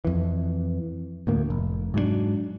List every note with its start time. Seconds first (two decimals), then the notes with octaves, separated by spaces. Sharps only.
0.05 F2 E3
1.27 D2 A2 A#3
1.50 F1
1.94 G#2 F#3 G3 D4